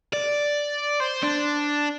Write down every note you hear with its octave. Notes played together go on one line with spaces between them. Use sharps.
D5
C5
D4